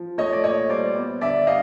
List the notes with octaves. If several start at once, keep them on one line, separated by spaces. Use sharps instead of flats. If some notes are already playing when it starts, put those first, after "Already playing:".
Already playing: F3
A3 C#5 D#5
D5
A#2 C#5 D#5
G3 C5 D5
B3
D3 D5 E5
G3 D#5 F5